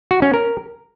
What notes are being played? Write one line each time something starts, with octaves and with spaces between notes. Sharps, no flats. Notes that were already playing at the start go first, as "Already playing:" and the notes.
F#4
C#4
A#4